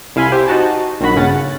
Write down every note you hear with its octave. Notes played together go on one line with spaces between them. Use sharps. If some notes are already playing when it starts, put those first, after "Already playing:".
C2 E4 F5 G#5 B5 C6
G4 C5
D#4 F#4 A5
A#1 D#3 F#3 F#4 B5
G1 C#3 C#4 F#5 A6